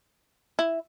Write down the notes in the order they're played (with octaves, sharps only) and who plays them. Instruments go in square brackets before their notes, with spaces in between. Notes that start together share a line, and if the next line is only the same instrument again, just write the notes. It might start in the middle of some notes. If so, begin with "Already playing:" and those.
[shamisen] E4